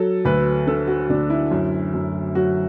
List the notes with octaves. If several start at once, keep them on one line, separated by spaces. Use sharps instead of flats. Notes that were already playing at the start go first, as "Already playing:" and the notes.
Already playing: F#3 A4
D2 B4
D3 A4
F#4
D2 D4
E4
F#2
F#2
F#3 F#4